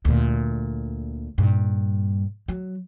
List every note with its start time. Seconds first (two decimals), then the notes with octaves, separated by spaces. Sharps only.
0.05 D2 A#2
1.38 G2 A#2
2.48 F#3